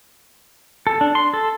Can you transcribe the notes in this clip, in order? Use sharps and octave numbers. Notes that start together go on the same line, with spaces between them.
A4
D4
C6
A4